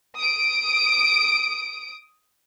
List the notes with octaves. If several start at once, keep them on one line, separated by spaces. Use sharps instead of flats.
D#6 D7